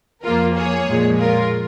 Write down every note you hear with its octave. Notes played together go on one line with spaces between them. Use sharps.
F2 F3 A#3 F4 A#4
G#4 C#5
A#2 F3 G#3
F4 A#4